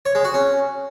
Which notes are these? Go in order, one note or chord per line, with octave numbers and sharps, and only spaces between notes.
C#5
G#3
F#4
C#4